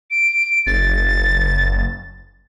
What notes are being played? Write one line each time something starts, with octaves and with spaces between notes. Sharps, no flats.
D7
F#1 A6